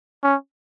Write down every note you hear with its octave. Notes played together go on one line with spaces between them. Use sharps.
C#4